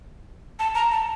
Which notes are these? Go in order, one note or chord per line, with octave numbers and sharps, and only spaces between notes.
A5
A#5
A5